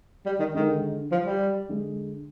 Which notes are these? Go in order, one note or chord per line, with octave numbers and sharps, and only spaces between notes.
G3
D#3
D3 D#3 G#3 D#4
F3
G3
D3 G#3